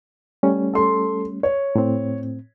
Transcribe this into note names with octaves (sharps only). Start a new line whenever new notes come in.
G3 A3 C#4
A4 C6
C#5
A2 C4